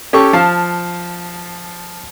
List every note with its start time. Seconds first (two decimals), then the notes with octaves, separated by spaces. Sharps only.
0.13 C#4 G4 A4 C#6
0.33 F3 F5 A5